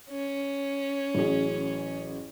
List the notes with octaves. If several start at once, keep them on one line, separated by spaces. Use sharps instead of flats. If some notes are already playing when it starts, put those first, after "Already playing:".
C#4
A1 F#3 G#4